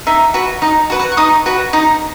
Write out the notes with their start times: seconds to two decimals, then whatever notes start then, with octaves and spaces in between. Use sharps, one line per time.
0.07 D#4 E5
0.34 F#4 B4
0.62 D#4 D#5
0.90 F#4 B4
0.99 F#5
1.12 C#6
1.17 D#4 D#6
1.46 F#4 B4
1.73 D#4 D#6